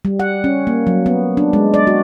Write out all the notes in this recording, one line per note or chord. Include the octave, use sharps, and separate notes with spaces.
G3
F#5
C#4
A#3
F#3
B3
D4
G#3
D5
F#4